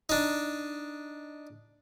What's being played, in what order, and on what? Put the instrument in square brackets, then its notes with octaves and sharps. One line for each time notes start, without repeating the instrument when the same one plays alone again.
[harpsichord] D4 D#4